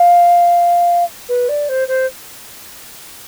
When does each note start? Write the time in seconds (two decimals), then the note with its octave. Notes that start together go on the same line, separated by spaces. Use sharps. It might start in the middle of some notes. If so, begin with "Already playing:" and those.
Already playing: F5
1.29 B4
1.49 D5
1.69 C5
1.88 C5